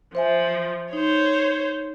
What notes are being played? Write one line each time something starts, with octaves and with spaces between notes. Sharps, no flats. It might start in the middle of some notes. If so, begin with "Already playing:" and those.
F3 C5 E5 G#5
D#4 C5 C#5